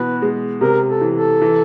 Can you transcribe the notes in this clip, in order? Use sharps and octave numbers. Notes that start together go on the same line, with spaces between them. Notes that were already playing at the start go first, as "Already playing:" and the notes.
Already playing: B2 E3 B4
G#3
C3 A#4
A4
E3
A4
E3